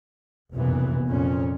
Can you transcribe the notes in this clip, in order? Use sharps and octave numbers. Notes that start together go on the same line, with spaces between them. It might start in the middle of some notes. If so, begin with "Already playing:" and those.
F1 B1 F#2 A#2 E3 B3
F2 A#2 C#4